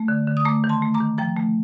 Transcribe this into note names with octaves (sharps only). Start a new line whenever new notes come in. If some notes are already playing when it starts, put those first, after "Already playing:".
Already playing: A3
D3
D3
D#6
A3 A#5 D6
D#3
A5 C6
A3
A#5 D6
D#3
F3 G5 A#5
A3